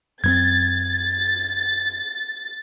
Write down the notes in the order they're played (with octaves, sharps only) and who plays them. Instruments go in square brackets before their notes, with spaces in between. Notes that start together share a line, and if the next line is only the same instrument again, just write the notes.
[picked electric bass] F#2 B3 C4 [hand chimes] G#6 [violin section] A6